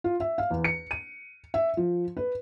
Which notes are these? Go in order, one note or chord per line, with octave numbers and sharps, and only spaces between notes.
F4
E5
F5
E2
C#7
D#7
E5
F3
B4